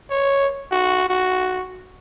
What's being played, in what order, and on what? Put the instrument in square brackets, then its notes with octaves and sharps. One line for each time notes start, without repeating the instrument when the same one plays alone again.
[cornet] C#5
F#4
F#4